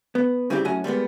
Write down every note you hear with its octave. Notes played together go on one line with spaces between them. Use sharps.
B3
C#3 G3 C4 E4 F4 G4
F#2 A2 C#4 F#4 G#5
G3 G#3 A#3 B3